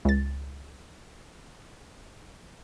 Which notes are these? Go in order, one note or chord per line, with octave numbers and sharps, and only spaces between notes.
C#2 A6